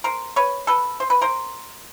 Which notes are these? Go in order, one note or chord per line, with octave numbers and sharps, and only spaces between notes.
A#4 C5
B4 C#5
A4 B4
C5
B4
A#4 C5